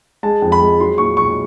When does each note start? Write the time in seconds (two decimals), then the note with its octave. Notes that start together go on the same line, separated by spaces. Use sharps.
0.23 G#3 A5
0.42 F2
0.52 B5
0.60 G#3
0.79 F#3 C6
0.98 A#2 C#6
1.17 B1 C#6